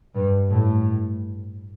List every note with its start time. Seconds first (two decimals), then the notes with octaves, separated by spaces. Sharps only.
0.14 G2
0.49 A2